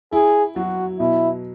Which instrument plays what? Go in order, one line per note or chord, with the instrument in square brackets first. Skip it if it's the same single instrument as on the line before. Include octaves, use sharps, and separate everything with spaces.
[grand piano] E4 [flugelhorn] G#4
[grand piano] F#3 [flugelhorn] F#4
[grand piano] B2 [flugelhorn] E4